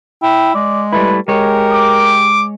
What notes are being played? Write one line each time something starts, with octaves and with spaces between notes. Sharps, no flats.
E4 G5
G#3 D5
G3 A3 E4 B4
G#3 G4 A#4 C#5
D6